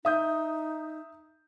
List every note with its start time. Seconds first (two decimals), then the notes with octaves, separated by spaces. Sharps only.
0.05 D#4 E5 D#6 G6